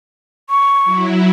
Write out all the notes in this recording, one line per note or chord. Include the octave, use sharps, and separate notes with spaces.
C#6
F#3 E4